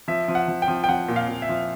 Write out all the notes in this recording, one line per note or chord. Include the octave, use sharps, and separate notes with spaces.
F3 E5
F3
F#5
F3
G5
F3
G5
F3 F#5
A#2
F5
A#2
E5
F3